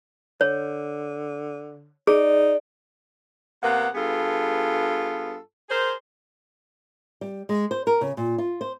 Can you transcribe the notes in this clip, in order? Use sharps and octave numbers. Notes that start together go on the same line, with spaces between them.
D3 C#5
D#4 G#4 D5
C3 A#3 B3 F#5
G2 B3 F4 G#4 A4
G#4 A#4 C5
G3
G#3
C5
A#4
C#3
A#2
F4
C5